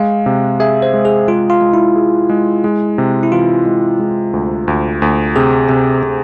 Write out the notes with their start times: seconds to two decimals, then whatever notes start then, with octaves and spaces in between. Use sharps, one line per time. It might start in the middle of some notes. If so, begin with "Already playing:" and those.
Already playing: G#3 F5
0.26 C3
0.60 G#4 E5
0.82 C5
0.94 G#3
1.05 G#4
1.28 G#3 F4
1.50 F4
1.61 G#3
1.74 E4
1.96 G#4
2.29 G#3
2.64 G#3
2.98 C3
3.23 E4
3.32 E3 F4
3.66 G#3
3.99 G#3
4.33 D2
4.68 D2
5.02 D2
5.36 C3 G#4
5.69 C3
6.03 C3